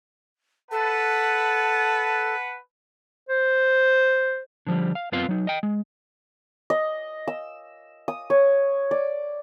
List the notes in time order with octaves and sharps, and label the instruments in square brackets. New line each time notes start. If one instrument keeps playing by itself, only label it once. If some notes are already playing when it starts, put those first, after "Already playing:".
[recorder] A4 [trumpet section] B4 F#5 [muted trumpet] A5
[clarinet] C5
[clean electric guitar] D3 F3 G3
F5
F#2 B3 C4 F4 F5 C6
F#3 D#4
D#5 G5
G#3
[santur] D#5
E6
D#6
C#5
D5